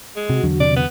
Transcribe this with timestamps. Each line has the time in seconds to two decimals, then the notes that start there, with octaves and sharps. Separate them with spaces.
0.16 G#3
0.30 C3 F#4
0.44 E2 D3 F#3
0.60 C3 D5
0.76 B3